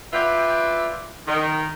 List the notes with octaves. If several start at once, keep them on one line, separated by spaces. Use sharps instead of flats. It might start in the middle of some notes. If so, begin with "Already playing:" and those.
F4 B4 D5 E5 G5
D#3